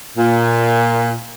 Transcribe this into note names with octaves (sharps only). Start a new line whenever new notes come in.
A#2